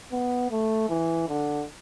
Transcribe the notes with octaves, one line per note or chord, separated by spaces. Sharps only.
B3
A3
E3
D3